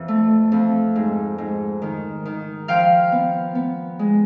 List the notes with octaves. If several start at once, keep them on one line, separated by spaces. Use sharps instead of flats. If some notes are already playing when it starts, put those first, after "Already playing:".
Already playing: F2 E3
A3
F2
G#2
G#2
D#3
D#3
F3 F5 G5
B3
B3
G#3